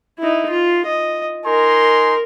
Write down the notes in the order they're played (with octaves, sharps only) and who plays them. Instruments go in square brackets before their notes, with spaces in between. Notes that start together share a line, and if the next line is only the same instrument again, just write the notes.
[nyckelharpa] D#4 E4
F4
D#5
[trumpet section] D#4 G#5 C6 [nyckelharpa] A#4